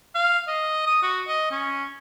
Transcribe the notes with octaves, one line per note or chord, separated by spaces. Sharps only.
F5
D#5
D#6
F#4
D#5
C#4